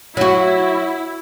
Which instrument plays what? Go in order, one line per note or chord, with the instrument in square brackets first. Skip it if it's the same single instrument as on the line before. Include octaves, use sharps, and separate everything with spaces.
[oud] F#3 F#4 [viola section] E4